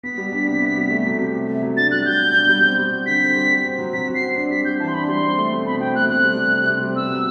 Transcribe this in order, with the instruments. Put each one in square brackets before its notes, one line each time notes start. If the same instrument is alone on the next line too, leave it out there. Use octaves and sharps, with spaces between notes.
[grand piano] B3 [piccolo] B6
[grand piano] G3
D4
C3
B3
G3
A3
F#3
C3
C3
A3
F#3
[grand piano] D4 [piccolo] A6
[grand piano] G3 [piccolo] F#6
[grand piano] F#4 [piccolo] G6
[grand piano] B2
D4
G3
C4
G3
F#4
[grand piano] D3 [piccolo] B6
[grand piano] C4
G3
F#4
C4
F#3
[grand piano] F#3 [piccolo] B6
[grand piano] F#4
[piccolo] C7
[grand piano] C4
[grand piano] D4 [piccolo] C7
[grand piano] G3 [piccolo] B6
[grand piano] F#4 [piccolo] G6
[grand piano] E3 [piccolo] A5
[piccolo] C6
[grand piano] D4 [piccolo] B5
[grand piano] G3 [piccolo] C6
[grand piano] C4
A3
B2
[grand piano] B2 [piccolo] B5
[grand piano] C4 [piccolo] G5
[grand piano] A3 [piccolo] F#6
[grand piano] C4 [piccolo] F#6
[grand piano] G3
C3
C3
C4
G3
[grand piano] B3 [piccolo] E6
[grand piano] F#3